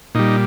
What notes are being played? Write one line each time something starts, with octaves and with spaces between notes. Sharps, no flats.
A#2 G3 D#4